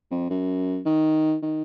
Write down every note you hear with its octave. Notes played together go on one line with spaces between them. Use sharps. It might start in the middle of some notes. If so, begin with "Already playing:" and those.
F2
F#2
D#3
D#3